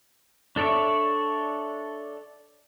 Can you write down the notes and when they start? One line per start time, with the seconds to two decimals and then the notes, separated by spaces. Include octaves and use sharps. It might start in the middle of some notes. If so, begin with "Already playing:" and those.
0.56 D4 A4 C#5 D5 E5